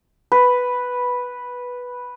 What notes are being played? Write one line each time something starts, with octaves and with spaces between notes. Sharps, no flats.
B4